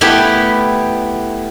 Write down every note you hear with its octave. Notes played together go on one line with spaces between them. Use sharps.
A3 B3 E4 G4 G5